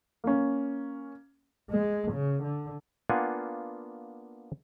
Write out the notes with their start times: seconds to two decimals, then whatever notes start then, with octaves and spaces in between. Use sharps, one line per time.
0.24 A#3 C#4
1.70 G#3
2.12 C#3
2.43 D3
3.10 A#3 B3 D4 F4 F#5 G#5